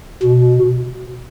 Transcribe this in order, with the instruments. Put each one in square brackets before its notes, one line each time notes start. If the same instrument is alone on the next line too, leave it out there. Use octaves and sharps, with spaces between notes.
[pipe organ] B2